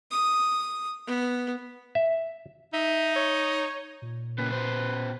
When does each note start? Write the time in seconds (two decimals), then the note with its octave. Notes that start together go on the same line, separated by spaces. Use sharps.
0.11 D#6
1.07 B3
1.95 E5
2.73 D#4 E5
3.16 C#5
4.02 A#2
4.38 C#3 A#3 B4
4.52 B2 C5